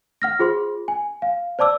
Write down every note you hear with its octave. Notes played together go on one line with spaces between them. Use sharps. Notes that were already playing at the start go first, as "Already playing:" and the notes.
F#5 F6 A#6
F4 G#4 C5 C6
G#5
F5
C5 D5 A5 D6 E6